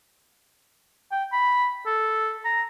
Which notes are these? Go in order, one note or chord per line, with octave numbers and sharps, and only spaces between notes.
G5
B5
A4
A#5